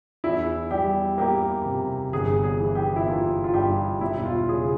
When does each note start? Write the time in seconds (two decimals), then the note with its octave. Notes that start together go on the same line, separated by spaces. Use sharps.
0.24 E2 E4
0.71 G3 G4
1.18 A#3 G4
1.65 C3
2.13 G1 G#4
2.44 G#4
2.60 E3
2.75 G4
2.96 E4
3.07 A#3 F4
3.44 F4
3.54 G2 G4
4.01 E1 E4
4.25 F4
4.49 C#3 G#4